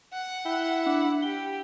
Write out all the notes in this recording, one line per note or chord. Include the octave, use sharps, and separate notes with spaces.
F#5
E4 G5
D4
G4 G7